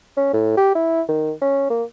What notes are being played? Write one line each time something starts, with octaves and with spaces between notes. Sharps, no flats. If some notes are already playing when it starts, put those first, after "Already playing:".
C#4
A2
G4
E4
D#3
C#4
A#3